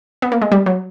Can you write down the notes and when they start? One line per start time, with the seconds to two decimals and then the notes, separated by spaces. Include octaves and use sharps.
0.22 B3
0.32 A#3
0.42 G#3
0.52 G3
0.66 F#3